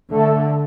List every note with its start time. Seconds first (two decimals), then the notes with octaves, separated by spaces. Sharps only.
0.10 D3 A3 A4